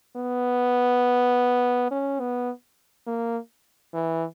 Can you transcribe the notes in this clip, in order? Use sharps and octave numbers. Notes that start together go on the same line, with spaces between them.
B3
C#4
B3
A#3
E3